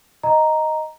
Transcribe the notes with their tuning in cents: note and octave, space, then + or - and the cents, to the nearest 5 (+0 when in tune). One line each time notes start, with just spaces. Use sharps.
D#5 +0 A#5 +0